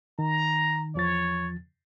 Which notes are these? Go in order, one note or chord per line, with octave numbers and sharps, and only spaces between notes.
D#3 A#5
E2 F3 C#5 A6